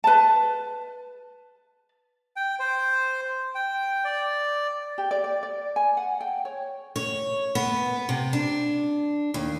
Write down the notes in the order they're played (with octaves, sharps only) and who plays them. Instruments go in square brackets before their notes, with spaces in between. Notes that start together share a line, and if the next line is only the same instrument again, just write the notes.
[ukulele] B4 A5
[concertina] G5
C5
G5
D5
[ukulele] G4
D5
D5
D5
G#5
F#5
G5
C#5
[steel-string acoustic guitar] C#5
B3
C3
D4
D#2